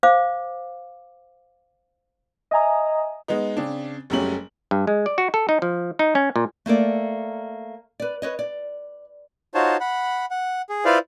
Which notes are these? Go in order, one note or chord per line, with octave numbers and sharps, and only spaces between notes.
C5 F5 D6
D#5 E5 G#5 A#5 D#6
G#3 B3 D#4
C#3 C4 D4
F#1 F#3 G3 A3 C#4 F#7
G2
G#3
D5
F#4
A4
D#4
F3
D#4
C#4
A#2
A3 A#3 A4 D5
B4 D5
B4 C#5 D#5
D5
D#4 F4 F#4 C5 C#5 A5
F#5 B5
F#5
G#4
E4 F4 B4 C5 D5 F5